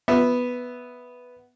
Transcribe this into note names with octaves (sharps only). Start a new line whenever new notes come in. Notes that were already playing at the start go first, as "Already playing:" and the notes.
B3 E5